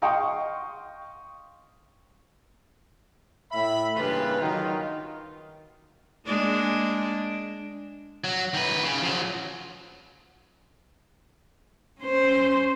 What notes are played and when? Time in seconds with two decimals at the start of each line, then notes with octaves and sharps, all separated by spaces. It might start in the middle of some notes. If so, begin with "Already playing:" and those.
0.02 D#5 F5 G5 C6 C#6 D#6
3.51 A2 E5 B5
3.96 G2 C#3 E3 A#3 F4 B4
4.40 D#3 F#3 F4
6.27 G#3 A#3 D4
8.24 F#3
8.54 D#3 B4
8.83 C#3
9.03 F3 F#3
12.00 C#4 C5